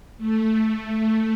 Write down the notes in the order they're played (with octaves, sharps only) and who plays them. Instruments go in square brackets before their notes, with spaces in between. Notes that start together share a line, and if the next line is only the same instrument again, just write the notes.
[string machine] A3